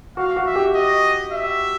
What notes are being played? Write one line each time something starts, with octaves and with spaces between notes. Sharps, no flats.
F#4 F5
F#4
E5
G4
D#5
E5